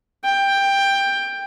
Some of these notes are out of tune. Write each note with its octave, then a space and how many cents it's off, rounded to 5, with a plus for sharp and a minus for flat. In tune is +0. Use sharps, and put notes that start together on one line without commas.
G5 +10